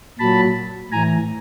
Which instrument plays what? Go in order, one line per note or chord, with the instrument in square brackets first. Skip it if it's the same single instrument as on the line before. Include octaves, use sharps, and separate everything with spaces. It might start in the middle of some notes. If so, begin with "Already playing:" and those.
[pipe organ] A#2 F#3 A5 B5
A2 E3 G#5 A#5